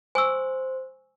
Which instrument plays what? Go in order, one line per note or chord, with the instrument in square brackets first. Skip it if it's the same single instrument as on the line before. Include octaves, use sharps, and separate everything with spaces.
[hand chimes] C5 [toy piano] G#5 C#6 E6